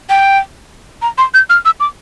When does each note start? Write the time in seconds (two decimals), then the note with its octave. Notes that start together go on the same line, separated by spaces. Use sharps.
0.10 G5
1.02 A#5
1.18 C6
1.34 G6
1.50 F6
1.65 E6
1.80 D6